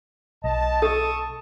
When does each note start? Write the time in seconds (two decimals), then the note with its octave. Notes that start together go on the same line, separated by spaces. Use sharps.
0.44 B1 D#5 A5
0.82 A4 A5 C#6 D#6